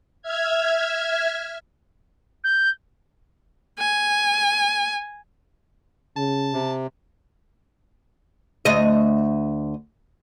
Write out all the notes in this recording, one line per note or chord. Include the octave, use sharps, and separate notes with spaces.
E5 F6 G#6
G6
G#5
C#3 A5
C3
D2 D#5